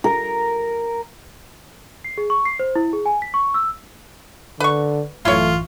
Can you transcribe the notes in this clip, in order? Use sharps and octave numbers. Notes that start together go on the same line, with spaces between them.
A#4
C7
G#4
C#6
C7
C5
E4
G#4
G#5
B6
C#6
E6
D3 B4 C#6
A1 F#2 E3 A3 E4 F4 C#5